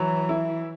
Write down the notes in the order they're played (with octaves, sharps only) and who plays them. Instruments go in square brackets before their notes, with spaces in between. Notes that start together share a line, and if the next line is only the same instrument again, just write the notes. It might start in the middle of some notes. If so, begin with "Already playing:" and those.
Already playing: [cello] E3 [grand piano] F#3
[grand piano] E4